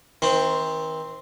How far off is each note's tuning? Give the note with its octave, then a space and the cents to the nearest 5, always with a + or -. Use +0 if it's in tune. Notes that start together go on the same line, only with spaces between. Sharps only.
D#3 +40 C4 +0